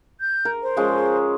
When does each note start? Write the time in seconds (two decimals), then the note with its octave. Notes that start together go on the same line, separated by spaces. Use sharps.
0.21 G6
0.45 A#4
0.63 C5
0.77 F3 G#3 C#4